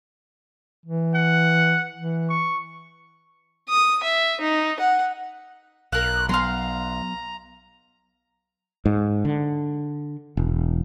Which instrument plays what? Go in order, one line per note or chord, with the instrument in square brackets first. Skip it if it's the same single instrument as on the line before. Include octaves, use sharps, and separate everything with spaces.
[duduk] E3
[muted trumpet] F#5
[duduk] E3
[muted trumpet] C#6
[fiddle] D#6
E5
D#4
F#5
[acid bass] B1 [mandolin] A#4 F5 [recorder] F#6
[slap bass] F#3 B3 [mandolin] F5 C6 [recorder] A#5
[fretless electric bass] G#2
D3
E1